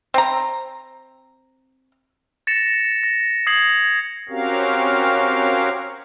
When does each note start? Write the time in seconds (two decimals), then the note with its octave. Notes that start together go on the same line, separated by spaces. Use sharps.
0.14 C4 A#5
2.47 A6 A#6 C#7 E7
3.03 A#6
3.47 D#6 G#6 A#6 C7 F#7
4.29 C4 C#4 F#4 G4 A#4 F5